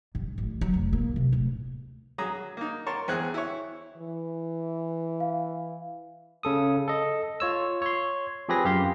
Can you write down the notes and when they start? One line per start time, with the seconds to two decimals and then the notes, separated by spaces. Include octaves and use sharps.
0.15 G2
0.38 A1
0.61 F#3
0.74 F1
0.93 A#3
1.16 C3
1.32 D1
2.18 F#3 G#4 A#5 D#6
2.57 A#3 D#4
2.86 A#4 C#5 A5 C6
3.08 E2 C4 G#4 F#6
3.34 E4 C#5
3.97 E3
5.20 F5
6.43 C#3 A4 D#6
6.88 A4 D#5
7.40 F4 C#5 E6
7.82 C#5 C6
8.49 F3 C4 G4 G#4 B4 A#6
8.65 F#2 G4 F5 C6